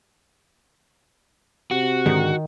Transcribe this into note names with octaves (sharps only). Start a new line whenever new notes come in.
C3 F#4
G#2 D3 D#3 G#3